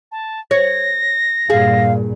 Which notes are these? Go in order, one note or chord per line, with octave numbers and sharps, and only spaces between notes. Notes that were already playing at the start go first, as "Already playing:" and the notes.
A5
C#5 A#6
G2 A#2 G#4 F5